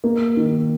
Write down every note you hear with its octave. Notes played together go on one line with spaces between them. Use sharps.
A#3
D#3